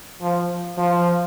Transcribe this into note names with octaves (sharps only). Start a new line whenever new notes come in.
F3
F3